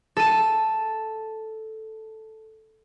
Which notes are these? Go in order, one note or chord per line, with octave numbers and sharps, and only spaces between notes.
A4 D#7